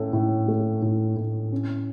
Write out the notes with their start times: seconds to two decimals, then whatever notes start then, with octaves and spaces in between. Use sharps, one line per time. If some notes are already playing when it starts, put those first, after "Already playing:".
Already playing: A2 C#4 A4
0.13 A2
0.48 A3
0.82 A2
1.17 A2
1.52 C#4